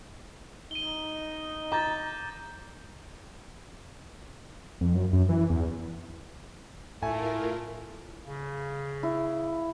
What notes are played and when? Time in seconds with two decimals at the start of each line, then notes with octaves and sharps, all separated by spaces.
0.71 D#4 D#7 G7
1.72 A#5 D6 G6 A6
4.81 F2
4.94 F#2
5.13 F#2
5.29 E3
5.50 E2
7.03 A2 A3 E4 F4 A#4 G#5
8.23 C#3
9.03 E4